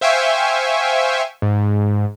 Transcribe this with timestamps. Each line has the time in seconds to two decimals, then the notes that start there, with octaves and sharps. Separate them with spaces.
0.01 C5 E5 F5 G5 G#5 C#6
1.42 G#2